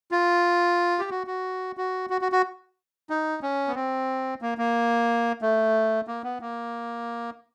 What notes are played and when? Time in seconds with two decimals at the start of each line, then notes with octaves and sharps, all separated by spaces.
0.11 F4
0.99 G4
1.10 F#4
1.27 F#4
1.77 F#4
2.10 F#4
2.21 F#4
2.32 F#4
3.10 D#4
3.42 C#4
3.67 B3
3.75 C4
4.42 A#3
4.58 A#3
5.42 A3
6.07 A#3
6.24 B3
6.41 A#3